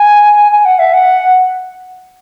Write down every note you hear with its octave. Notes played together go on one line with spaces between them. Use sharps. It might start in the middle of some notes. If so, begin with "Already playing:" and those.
Already playing: G#5
G#5
F#5
E5
F#5